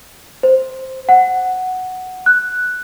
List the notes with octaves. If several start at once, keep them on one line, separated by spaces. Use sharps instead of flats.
C5
F#5
F#6